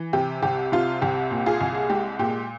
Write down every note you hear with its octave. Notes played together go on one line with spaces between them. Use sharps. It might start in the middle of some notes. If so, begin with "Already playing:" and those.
Already playing: E3
C3 G4
C2 G4
C3 F4
C2 G4
A#2
F4 G#4
C2
G#3 G4
A#2 G4